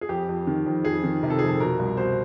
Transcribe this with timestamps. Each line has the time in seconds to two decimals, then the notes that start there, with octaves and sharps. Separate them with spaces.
0.01 G#4
0.09 F2 G4
0.29 F2
0.47 D#3
0.66 F2
0.85 F2 G#4
1.04 D#3
1.23 C3 A#4
1.30 A4
1.39 F2 G#4
1.47 A4
1.60 B2 A#4
1.79 C2
1.97 B2 C5